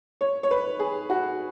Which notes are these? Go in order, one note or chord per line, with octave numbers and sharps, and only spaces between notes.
C#5
C#5
B4
G#4
F#4